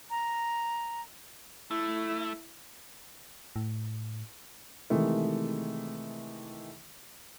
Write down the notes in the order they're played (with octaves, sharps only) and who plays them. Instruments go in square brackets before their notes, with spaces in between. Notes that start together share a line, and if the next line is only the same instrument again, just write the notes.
[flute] A#5
[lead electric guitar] A3 [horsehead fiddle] E4
[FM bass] A2
[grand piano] C3 D#3 E3 G#3 A3